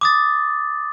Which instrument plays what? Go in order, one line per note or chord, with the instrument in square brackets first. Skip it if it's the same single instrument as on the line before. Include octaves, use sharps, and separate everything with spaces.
[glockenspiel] D6 D#6 A6